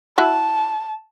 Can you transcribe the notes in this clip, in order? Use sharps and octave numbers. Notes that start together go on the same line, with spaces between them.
E4 F#4 E5 A5